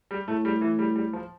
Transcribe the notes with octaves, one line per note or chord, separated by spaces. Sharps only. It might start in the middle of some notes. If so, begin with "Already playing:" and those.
G3
A2 A3
G3
E3
G3
G3
F3